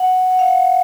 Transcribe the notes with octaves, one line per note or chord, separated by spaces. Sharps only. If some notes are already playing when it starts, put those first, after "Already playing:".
Already playing: F#5
F#5
F5
F#5